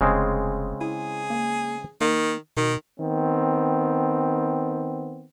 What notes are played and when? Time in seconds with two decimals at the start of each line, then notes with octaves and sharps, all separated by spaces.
0.01 F1 C#3 G#3 C4
0.81 E4 G#4
1.30 A#3
2.01 D#3 A#3
2.57 B2 D#3
3.00 D#3 B3 C4